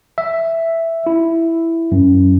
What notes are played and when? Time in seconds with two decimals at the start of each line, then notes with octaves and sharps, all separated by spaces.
0.18 E5
1.07 E4
1.92 F#2